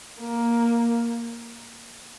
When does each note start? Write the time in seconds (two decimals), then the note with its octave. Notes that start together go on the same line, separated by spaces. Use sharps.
0.21 A#3